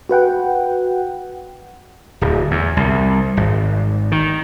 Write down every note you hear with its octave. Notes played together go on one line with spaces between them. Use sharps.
F#4 B4 F#5 G5
D1
E2
C2
G#1
D#3